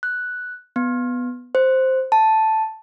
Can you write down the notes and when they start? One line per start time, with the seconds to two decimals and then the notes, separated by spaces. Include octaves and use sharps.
0.03 F#6
0.76 B3
1.55 C5
2.12 A5